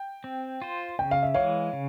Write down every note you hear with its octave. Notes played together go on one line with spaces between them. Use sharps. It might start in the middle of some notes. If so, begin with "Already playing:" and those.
Already playing: G5
C4
F4 C5
C#3 G5
F5
E5
E3 G#3 C#5 F5
C#3